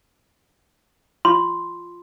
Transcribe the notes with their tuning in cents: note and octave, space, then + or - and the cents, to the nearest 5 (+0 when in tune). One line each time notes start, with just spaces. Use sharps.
F4 +0 C6 +0